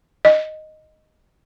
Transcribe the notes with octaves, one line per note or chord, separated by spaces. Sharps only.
D#5